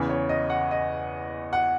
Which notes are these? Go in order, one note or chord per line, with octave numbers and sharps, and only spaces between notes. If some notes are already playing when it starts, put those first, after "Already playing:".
Already playing: E2 C#3 E3
C#5
D#5
F#5
D#5
F#5